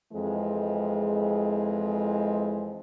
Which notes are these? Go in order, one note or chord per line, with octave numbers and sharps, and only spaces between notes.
F2 E3 G#3